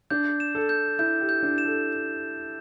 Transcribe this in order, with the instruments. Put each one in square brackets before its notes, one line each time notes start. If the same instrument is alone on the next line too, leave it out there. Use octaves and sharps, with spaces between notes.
[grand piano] D4 [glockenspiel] G6
[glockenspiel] E7
[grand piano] A4
[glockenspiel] G6
[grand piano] E4 [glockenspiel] G6
[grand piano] G4
[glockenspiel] G6
[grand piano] D4
[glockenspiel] E7
[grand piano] A4